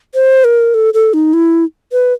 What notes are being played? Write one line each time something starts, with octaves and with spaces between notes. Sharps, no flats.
C5
A#4
A4
A4
D#4
E4
B4